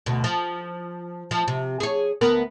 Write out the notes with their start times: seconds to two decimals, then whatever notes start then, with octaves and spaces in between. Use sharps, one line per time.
0.06 D2 B2
0.24 F3
1.31 F3
1.48 C3
1.80 G#4 C#5
2.21 D2 B3 A#4